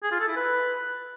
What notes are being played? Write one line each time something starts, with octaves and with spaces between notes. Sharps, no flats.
G#4
F4
A4
E4
B4